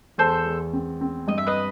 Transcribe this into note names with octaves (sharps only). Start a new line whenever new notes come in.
E2 A4 C5
E2
C4
C4
G2 D#5
E5
B4 D#5